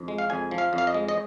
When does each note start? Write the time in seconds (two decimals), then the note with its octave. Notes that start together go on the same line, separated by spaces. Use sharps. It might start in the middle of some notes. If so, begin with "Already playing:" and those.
Already playing: F2
0.08 G#3
0.18 F5
0.30 F2 G#5
0.51 F3
0.58 F5
0.73 F2
0.78 F5
0.87 D#5
0.94 G#3
1.08 D#5